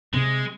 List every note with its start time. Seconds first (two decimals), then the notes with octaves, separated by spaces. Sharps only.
0.14 C3 G#3